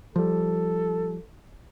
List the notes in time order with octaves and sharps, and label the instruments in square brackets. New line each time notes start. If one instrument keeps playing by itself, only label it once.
[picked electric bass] F3 G3 [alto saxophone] A4